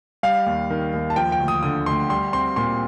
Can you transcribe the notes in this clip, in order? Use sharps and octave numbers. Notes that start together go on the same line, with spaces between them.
G3 F5
D#2
D#3
D#2
A5
F3 G5
G5
D2
D#6
D3 D#6
D2 C6
G3 C6
C4 C6
A#2 C6